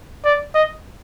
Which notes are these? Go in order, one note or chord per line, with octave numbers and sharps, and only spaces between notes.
D5
D#5